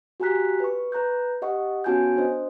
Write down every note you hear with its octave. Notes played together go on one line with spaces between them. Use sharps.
F#4 G4 G#5 A#5 F#6 B6
B4 C#6
B4 A#5 F#6 G6
G4 D#5 F#5 C#6
B3 C#4 F#4 G#5 A5 G6
D4 C5 D#5